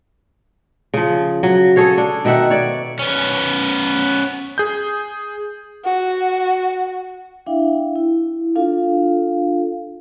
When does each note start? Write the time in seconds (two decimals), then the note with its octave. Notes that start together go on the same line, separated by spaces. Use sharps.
0.94 C#3 F3
1.43 F#3
1.76 G#4 A4 C#5 F5
1.98 D4
2.25 B2 D#3 E5 F#5
2.50 C#5 D5
2.99 B3 C#4
4.58 G#4 G6
5.84 F#4
7.46 D4 E4 E5 F5 G5
7.96 E4
8.56 D4 F4 A4 F5